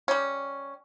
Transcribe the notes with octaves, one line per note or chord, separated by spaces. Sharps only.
G3 C#4